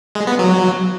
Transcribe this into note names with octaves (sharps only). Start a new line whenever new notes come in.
G#3
B3
F#3